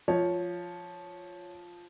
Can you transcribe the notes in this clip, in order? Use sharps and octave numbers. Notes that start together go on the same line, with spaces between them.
F3 C#5